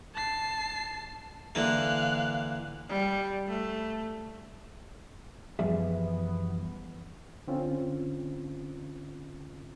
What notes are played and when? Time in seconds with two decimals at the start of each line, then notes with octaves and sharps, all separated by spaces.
0.14 A5 C7
1.55 D3 E3 A#3 F5 F#6
2.89 G3
3.47 A3
5.59 F#2 E3 F3 G3 B3 G#4 E5
7.47 D3 C4 C#4 F4